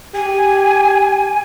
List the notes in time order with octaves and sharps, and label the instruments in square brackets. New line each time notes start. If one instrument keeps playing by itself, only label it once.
[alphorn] G4 [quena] G#5